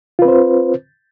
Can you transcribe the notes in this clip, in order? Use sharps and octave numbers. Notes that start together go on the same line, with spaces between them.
C4 F4 B4 C5